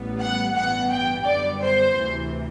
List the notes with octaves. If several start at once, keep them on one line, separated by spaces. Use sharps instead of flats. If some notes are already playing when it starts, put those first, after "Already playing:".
Already playing: A1 A2 G3 B3
F#5
A1 G2 E3 B3 F#5
G5
F#2 D3 G3 B3 D5
C5
D2 C3 E3